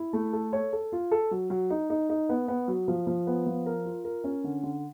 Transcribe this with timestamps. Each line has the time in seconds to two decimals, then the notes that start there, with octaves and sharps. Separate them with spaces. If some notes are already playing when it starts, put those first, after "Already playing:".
Already playing: E4
0.13 A3
0.33 A4
0.53 C#5
0.73 A4
0.92 F4
1.11 A4
1.31 F#3
1.50 F#3
1.70 D#4
1.90 D#4
2.10 D#4
2.29 B3
2.48 B3
2.68 F#3
2.88 F3
3.07 F3
3.27 B3
3.46 F3
3.66 A#4
3.85 F4
4.04 A#4
4.24 C#4
4.44 D3
4.63 D3